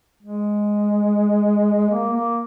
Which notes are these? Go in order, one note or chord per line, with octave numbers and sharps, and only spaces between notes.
G#3
A#3
A#3